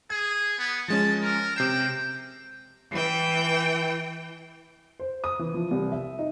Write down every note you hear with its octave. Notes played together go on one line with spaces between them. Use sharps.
G#4 G#6
B3
F3 G#3 C#4 A5
A#4
C3 G5 C7 E7
E3 G5
C5
D#6
E3
F3
C2
E5
D#4